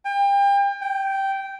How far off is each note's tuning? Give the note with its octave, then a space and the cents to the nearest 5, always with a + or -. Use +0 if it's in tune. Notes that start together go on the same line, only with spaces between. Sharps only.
G5 +35
G5 -10